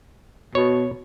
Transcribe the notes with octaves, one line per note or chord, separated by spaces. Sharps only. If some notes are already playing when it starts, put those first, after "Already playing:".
B2 C#5